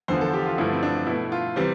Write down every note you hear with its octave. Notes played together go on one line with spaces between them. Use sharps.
E2 D3 F3 C5
A4
G4
F4
G2 D3 F3 A3 E4
C4
D4
B2 A3 E4
F4
C3 E3 G3 C5